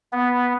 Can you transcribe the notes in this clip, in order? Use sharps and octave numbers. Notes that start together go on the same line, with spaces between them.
B3